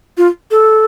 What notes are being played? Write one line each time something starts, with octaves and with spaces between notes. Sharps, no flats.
F4
A4